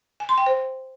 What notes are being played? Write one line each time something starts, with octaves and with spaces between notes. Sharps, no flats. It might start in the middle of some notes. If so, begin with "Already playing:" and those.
G#5
C6
G5
C5